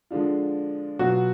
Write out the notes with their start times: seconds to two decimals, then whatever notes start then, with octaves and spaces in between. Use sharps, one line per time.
0.11 D3 F3 G#3 D4 F4
0.99 B2 F#3 B3 F4 F#4